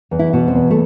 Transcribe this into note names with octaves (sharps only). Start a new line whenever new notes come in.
E2
E4
B2
C4
E2
A3